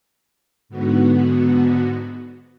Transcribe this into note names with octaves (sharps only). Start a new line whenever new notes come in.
G#2 D3 B3 F#4